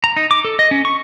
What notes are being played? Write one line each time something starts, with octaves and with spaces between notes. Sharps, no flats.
A#5
D#4
D6
A4
D#5
C#4
C#6